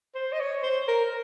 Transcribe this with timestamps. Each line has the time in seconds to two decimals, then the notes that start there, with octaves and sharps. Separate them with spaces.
0.15 C5
0.32 D#5
0.40 C#5
0.63 C5
0.88 A#4